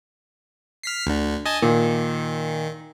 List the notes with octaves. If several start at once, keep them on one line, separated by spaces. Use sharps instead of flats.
F6 B6 C7
D2 D3
D#5 G#5 A5
A#2 D#3